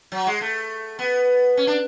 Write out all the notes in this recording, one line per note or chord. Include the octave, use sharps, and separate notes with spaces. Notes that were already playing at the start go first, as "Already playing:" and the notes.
F#3
G#3
A3
B3
C#4
D4